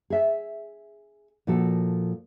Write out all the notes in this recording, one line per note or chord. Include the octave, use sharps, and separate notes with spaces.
G#4 E5
A#2 F3 F#4 A4